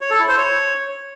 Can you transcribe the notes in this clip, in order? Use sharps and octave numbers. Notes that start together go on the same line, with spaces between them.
C#5
A4
E4
C5
C#5